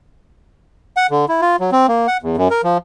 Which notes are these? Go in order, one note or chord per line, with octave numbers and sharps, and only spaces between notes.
F#5
D3
E4
F4
F#3
C4
A#3
F#5
E2
F#2
A#4
F3